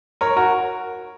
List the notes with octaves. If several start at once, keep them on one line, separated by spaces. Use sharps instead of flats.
A#4 C#5
F#4 A#4